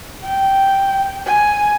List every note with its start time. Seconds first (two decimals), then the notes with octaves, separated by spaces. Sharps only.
0.24 G5
1.26 G#5